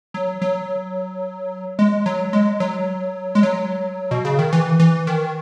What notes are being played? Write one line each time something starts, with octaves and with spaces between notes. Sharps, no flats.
F#3
F#3
G#3
F#3
G#3
F#3
G#3
F#3
B2
C#3
D#3
E3
E3
D#3